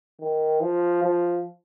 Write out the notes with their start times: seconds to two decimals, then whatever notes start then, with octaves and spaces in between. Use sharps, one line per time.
0.20 D#3
0.61 F3
1.03 F3